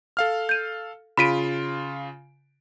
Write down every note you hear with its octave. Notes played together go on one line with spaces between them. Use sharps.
A4 F5 F6
G6 D#7
C#3 F4 B5 B6 D7 D#7